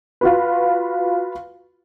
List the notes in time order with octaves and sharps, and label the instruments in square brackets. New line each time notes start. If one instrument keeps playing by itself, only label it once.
[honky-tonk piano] F4 F#4 B4